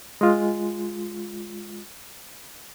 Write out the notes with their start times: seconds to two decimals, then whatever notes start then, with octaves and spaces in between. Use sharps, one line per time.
0.21 G#3 F4